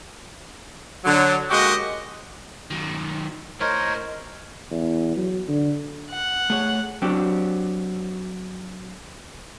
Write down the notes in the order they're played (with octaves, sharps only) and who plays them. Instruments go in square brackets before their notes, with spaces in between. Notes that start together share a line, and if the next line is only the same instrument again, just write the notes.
[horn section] D3 F#3
G#3 A#3 F#4 G4 D#5
[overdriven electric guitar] D#3 F#3
[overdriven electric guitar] A2 D#5 [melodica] A#4 C5 C#5
[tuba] E2
F#3
D3
[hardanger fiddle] F#5
[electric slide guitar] A3 G#4 C#5
[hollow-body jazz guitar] F#3 C4 D4 G4